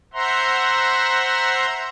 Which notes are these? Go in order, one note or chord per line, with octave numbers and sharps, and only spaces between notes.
C5 E5 F#5 A#5 C6